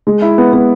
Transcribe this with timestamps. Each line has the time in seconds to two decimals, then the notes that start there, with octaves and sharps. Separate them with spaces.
0.07 G#3
0.22 E4
0.38 B3
0.53 B3